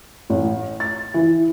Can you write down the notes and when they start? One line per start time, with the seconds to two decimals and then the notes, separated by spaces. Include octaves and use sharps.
0.30 A1
0.80 A6
1.14 E3